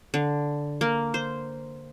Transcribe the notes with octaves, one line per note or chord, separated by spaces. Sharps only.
D3
A#3
C5